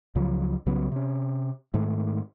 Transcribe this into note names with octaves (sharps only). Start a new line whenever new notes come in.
C#2 C#3 F3 F#3
C2 C#3 F#3 B3
C3 C#4
G#2 D#3 A3